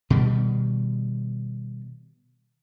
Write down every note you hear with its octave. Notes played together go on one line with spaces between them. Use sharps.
B2 D#3 G3